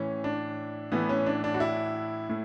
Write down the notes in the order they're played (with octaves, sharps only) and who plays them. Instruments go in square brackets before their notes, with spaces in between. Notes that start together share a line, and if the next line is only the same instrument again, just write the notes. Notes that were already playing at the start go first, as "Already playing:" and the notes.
Already playing: [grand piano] A2 E3 C#4
D4
A2 E3 B3
C#4
D4
D4
F#4
E4
A2